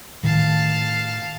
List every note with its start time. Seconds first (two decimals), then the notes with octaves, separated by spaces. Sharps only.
0.23 A2 D#3 F5 A5